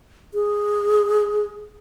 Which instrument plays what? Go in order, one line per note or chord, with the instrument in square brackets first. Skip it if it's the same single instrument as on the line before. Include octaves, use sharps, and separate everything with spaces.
[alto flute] G#4